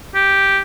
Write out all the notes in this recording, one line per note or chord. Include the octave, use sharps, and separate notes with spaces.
G4